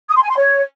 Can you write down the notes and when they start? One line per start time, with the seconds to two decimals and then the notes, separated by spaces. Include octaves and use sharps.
0.09 D#6
0.16 C6
0.23 G#5
0.30 C6
0.37 C#5